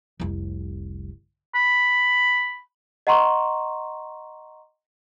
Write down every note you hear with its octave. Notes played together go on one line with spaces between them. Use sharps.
F1 C2
B5
D#5 F#5 A#5 C6 C#6